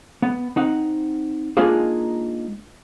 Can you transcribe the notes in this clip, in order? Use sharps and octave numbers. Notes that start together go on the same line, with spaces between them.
B3
C4 D#4 F#5
G#3 A#3 D4 D#4 F4 G#4